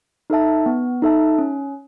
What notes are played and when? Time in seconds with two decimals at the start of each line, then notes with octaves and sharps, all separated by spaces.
0.30 D#4 A4 E5 A5
0.66 B3
1.02 D#4 A4 E5 A5
1.39 C#4